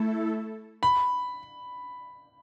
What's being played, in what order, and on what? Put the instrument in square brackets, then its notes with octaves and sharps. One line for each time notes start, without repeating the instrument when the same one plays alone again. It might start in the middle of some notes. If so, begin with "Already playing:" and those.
Already playing: [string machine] A3 E4 A4
[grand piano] B5